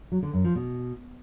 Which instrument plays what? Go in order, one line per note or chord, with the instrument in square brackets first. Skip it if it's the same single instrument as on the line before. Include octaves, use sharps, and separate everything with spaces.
[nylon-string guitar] F#3
D3
F#2
F3
B2